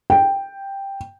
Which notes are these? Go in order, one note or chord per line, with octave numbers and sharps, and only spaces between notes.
G5